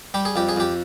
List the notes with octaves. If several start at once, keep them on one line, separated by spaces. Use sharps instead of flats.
G3 G4
G#4
F2 G4
G#4
F2 G4